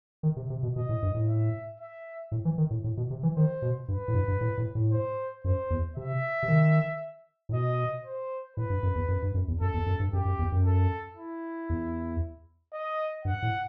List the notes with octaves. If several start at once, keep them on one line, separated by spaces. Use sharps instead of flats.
D#3
C3
C3
B2
B2 D#5
A2
G2
A2
E5
E5
A2
E3
D#3
A2
A2
B2
C3
E3
D#3 C5
B2
G2 B4
A2
G2
G2
A2
A2
A2
C5
F#2 C5
E2
C3 E5
C3
D#3
A2
B2 D#5
C5
A2 B4
G2
F#2
E2
F#2
G2
F#2
E2
F#2 A4
E2
F#2
G2
F#2 G4
F#2
E2
F#2
A4
E4
E2
D#5
G2 F#5
A2